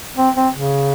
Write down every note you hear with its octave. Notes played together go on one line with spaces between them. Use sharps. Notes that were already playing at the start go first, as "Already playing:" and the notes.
C4
C4
C#3